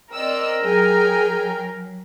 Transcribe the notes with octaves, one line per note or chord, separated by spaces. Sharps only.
C4 A#4 D5 D#5 E6
F#3 G#4 G5 G#5